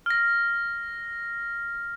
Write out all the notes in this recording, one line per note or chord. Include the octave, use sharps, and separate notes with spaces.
F6 A#6